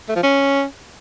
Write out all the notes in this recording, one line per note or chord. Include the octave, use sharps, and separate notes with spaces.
A3
F3
C#4